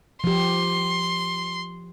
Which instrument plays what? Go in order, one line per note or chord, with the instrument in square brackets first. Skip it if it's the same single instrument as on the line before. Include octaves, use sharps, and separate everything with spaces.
[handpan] F3 G4 [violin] C6